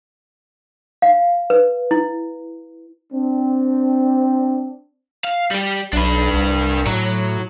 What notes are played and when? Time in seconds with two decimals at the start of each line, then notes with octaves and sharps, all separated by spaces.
1.02 F5
1.50 B4
1.91 E4
3.12 C4 D4
5.25 F5
5.51 G3 G4
5.93 B1 D4 B4
6.34 C2
6.86 A2 F#3